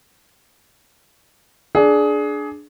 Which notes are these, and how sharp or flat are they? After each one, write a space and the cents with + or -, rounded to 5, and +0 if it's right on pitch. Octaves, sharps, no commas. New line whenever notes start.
D4 +0 G#4 +20